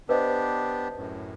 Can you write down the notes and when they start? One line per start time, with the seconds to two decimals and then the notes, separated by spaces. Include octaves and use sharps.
0.09 B3 D4 G4 B4 C5 D#5
0.97 F#2 A2